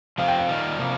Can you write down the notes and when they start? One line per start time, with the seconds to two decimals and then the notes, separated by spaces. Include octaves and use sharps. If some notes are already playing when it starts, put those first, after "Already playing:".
0.18 F3 C4 G4 F5
0.28 G5
0.39 F5
0.49 D#3 G3 A#3 F4
0.79 C3 F3 A#3